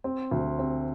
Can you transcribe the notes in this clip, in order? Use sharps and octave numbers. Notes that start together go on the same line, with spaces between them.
C4
D2
C4